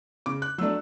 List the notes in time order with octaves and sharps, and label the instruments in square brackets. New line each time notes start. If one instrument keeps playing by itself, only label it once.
[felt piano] C#3 D6
F#6
F#3 A3 D4 E6